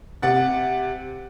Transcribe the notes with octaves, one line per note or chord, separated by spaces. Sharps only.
C3 F#5 A6